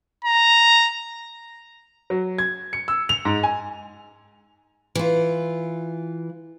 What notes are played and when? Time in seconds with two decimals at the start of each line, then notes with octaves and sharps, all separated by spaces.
0.25 A#5
2.10 F#3
2.38 G#6
2.73 C#7
2.88 E6
3.09 F7
3.25 G#2
3.43 G#5
4.95 E3 F4